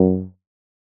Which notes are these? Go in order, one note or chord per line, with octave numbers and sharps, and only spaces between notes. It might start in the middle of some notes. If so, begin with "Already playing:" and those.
Already playing: F#2